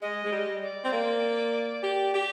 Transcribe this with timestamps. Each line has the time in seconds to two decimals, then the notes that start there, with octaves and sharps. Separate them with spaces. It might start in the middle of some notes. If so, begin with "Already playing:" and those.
0.02 G#3 D#5
0.24 G#3
0.32 G3
0.62 D5
0.84 C4
0.93 A#3
1.83 G4
2.14 G4